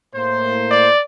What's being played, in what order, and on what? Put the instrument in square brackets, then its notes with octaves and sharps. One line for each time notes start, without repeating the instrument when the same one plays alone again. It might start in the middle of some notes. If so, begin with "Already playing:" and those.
[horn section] A2 A#3 C5
[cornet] D5